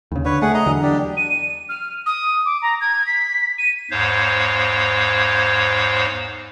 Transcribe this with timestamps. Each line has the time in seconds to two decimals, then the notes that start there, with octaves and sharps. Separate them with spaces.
0.12 D#2 C#3
0.25 D3 B4 C#5
0.42 A3 G#4 F#5
0.54 D#5 A#5
0.66 E2 D3 F#3
0.83 D4 G4
1.16 D#7
1.68 F6
2.06 D#6
2.45 D6
2.61 A#5
2.80 G#6
3.06 B6
3.58 D#7
3.91 E2 G#2 C5 C#5 F5